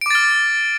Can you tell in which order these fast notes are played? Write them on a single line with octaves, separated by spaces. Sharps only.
D7 D6 A6 F6